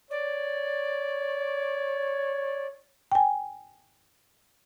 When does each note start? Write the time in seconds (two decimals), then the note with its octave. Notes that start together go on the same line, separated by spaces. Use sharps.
0.11 C#5 D5
3.12 G5 G#5